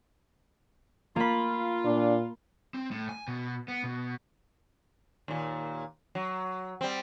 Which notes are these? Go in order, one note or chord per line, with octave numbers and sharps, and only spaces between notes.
A#3 F4 B5
A#2 D4
C4
A2
G#5
B2
B3
B2
D#2 A#2
F#3
G3 C4